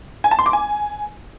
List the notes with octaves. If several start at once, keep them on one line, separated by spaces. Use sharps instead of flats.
G#5
A5
C6
D6
G#5